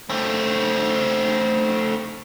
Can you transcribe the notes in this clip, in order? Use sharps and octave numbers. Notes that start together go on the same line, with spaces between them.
A3 C4